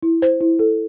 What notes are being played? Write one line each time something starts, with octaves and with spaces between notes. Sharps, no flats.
E4
C5
E4
A4